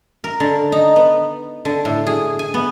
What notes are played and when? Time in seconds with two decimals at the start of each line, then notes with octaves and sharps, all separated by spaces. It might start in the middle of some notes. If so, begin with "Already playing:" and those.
0.24 A#4
0.40 D3
0.72 D#4
0.96 B3
1.65 D3
1.85 A2
2.07 G#4
2.39 G#5
2.54 B3